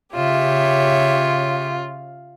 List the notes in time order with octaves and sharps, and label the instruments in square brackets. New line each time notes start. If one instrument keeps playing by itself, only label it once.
[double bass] C#3 [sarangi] F4 [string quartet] G4 C#5 E5